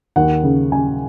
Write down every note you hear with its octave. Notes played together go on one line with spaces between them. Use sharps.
D#2 F#5
C#3
C#3 G#5